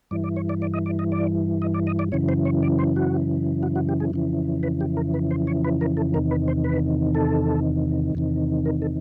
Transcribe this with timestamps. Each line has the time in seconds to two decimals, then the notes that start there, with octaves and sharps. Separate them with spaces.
0.11 G2 E3 D5
0.24 D5
0.36 C#5
0.49 D5
0.62 D5
0.74 D#5
0.86 D5
0.99 D#5
1.12 D5
1.62 D#5
1.74 D5
1.87 D#5
1.99 D5
2.12 F#2 C#3 E3 C#5
2.29 C5
2.45 C#5
2.63 D5
2.79 C5
2.96 F#4
3.63 F#4
3.75 F#4
3.89 G4
4.00 G#4
4.13 F2 C#3 E3
4.63 B4
4.81 G4
4.97 A#4
5.14 B4
5.31 C5
5.47 C#5
5.64 B4
5.81 A#4
5.97 A4
6.14 E2 C3 D#3 A#4
6.31 B4
6.48 C5
6.64 B4
7.15 A4
8.15 E2 C3 D#3
8.65 A#4
8.82 A4